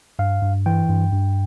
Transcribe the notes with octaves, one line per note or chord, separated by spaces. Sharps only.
G2 F5
G2
E3 G5
G2
G2